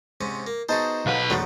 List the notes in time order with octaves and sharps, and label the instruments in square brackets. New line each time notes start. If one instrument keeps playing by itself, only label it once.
[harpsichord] G#2 C3 C#4
A#3
[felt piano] B3 [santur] D#4 A5 [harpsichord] F#4 G#4 C5
[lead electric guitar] B1 B4 [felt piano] F5 F#5
[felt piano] E1 F#4 A6 [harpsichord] C#3 F3 A3 [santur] F#3